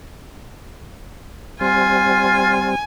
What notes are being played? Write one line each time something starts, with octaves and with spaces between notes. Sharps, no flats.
G3 C4 F4 G#5